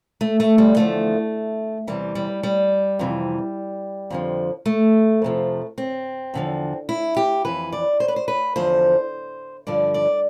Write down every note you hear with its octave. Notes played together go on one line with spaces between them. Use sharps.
A3
A3
G3
E2 D3 F3 A3
E2 C3 E3 G3
G3
G3
F2 C3 E3
F2 D3 F3
A3
F2 C3 F3
C4
E2 D3 F3
E4
G4
F2 E3 B4
D5
C5
B4
C5
B4
E2 D3 F3 C5
G2 D3 F3 D5
D5